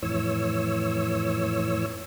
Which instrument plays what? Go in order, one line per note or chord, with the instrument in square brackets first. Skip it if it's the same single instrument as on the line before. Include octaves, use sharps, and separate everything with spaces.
[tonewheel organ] F2 A2 E3 C#5 E6